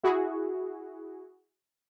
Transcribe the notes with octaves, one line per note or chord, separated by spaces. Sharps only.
E4 F#4 G#4